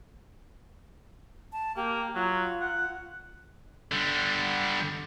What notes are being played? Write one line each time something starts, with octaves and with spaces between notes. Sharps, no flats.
A5
A#3 G4
F#3 F4
F#5
D3 G3